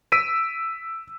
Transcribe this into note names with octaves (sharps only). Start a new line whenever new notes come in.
E6 B6 D7 D#7